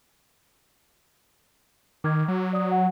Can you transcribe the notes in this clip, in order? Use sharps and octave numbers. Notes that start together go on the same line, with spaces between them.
D#3 D6 F6 G#6
F#3
D5 D#6
F#5